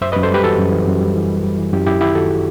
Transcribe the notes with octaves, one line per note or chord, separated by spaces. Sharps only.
F#2 C5 E5
B4 D#5
F#2
A4 C5
G3 G4 B4
E3 F#4 A4
F#2
E3
F#2
G3
E3
G3
G3
E3
F#2 E4 G4
F#2 E4 G4
D#3 E4 G4
D#3 F#4 A4